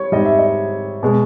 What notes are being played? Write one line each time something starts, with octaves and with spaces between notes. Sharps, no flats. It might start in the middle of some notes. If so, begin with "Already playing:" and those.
Already playing: G3 C#5
G#2 G3 D#5
E5
D#5
B2 G#3